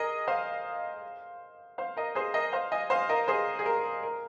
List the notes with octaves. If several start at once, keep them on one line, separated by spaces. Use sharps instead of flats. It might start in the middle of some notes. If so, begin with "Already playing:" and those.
Already playing: G#4 A#4 D#5
C5 F5
C5 F5
A#4 D#5
G#4 C5
A#4 D#5
C5 F5
D#5 G#5
C5 F5
A#4 D#5
G#4 C5
G#4
A#4
A#4